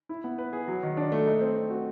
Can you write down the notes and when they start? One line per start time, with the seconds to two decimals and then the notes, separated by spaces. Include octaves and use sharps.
0.09 E4
0.24 B3
0.38 B4
0.53 G#4
0.68 F#3
0.83 D#3
0.97 D4
1.12 A3
1.27 D#4
1.41 C4
1.56 C4
1.70 F#4